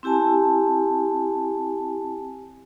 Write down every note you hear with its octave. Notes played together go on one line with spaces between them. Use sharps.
C4 E4 G4 G#5 A5